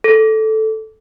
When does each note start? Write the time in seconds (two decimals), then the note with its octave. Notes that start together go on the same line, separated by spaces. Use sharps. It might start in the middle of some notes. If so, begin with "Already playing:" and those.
0.04 A4